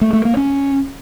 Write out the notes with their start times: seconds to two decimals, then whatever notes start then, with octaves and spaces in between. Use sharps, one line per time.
0.01 A3
0.13 A3
0.25 A#3
0.37 C#4